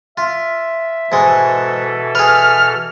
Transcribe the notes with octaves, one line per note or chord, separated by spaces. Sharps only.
F4 E5
G#2 B2 E3 G#3 A4
G#4 B4 F6